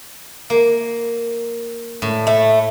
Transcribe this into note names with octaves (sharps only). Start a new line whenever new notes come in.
A#3
A2
A3